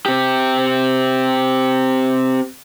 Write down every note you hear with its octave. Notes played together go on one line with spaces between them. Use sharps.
C4 G4